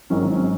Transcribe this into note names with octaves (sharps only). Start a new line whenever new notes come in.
G#1 G#2 D#3 F#3 C#4